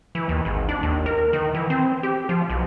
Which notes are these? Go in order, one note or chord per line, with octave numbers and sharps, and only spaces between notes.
E3
D#2
G#1
D4
D#2
A#4
D#3
E3
C4
G4
F3
B1